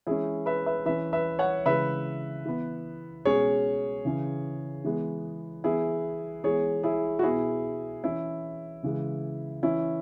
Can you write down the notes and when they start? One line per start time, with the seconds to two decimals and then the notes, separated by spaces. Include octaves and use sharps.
0.07 E3 G#3 C#4 E4 G#4
0.46 B4 E5
0.66 B4 E5
0.86 E3 C#4 B4 E5
1.13 B4 E5
1.39 C#5 F#5
1.66 C#3 E3 G#3 B4 E5
2.46 E3 B3
3.25 B2 G#3 C#4 G#4 C#5
4.05 C#3 E3 C#4
4.85 E3 G#3 B3
5.64 E3 B3 E4 G#4
6.44 E3 G#3 B3 G#4 C#5
6.83 E4 G#4
7.19 F#4
7.23 B2 B3 E4 G#4
8.04 E3 C#4 E4
8.83 C#3 E3 G#3
9.63 E3 C#4 E4